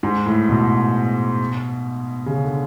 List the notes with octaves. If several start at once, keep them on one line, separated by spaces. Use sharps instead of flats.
G#2
A2
B2
C#3
D3